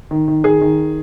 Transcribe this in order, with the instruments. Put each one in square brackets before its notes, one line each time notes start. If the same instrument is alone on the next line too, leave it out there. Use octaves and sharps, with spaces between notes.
[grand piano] D#3
D#3
D#3 G#4
D#3